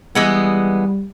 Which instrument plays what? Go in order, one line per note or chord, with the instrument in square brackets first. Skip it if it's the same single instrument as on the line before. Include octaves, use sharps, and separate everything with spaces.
[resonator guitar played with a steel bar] E3 G#3 B3 [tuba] G3